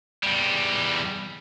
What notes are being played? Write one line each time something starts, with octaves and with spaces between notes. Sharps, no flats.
E2 G3